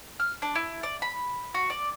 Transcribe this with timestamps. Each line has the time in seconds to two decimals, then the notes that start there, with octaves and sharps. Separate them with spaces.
0.20 F6
0.42 D4
0.55 E4
0.83 D5
1.02 B5
1.54 F#4
1.70 D5